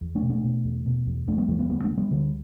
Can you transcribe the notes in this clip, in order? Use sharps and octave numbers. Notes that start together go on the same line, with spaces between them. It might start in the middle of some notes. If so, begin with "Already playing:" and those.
E2
A3 D4
B2
A3 D4
B2
E2
B2
E2
E2 A3 D4
G3 B3
E2 E3 A3
G3 B3
D2 G3 B3
A3 D4
D2
G3 B3
D2 D3 G3